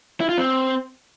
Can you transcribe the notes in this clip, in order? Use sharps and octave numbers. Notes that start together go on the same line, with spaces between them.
E4
F4
C4